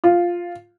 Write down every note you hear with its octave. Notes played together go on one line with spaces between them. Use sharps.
F4